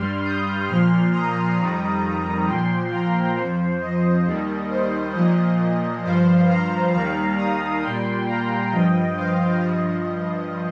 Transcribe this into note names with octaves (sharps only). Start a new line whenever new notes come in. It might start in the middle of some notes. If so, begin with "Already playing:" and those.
Already playing: G2 G3 C6 F6
D#6 G6
A#2 F3 C6 F6
A#5 D#6
F2 D#3 G3
A#2 F3 G5 C6
F5 A#5
F2 F3 C5
D#5
D#2 D#3 G3
C5
A#2 F3 D#5
G2 F3 C5 F5
F5 A#5
D#2 D#3 G3 F5 A#5
A#5 D#6
A#2 G3 G5 C6
F5 A#5
G2 F3 D#5 G5
C5 F5
G2 F3 D#5